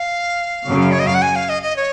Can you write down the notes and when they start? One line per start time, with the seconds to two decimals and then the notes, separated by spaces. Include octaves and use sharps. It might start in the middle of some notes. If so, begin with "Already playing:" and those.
Already playing: F5
0.67 F#2 C#3 F#3
0.92 C#5
1.00 D#5
1.07 F5
1.14 F#5
1.22 G#5
1.36 F5
1.49 D#5
1.63 D#5
1.76 C#5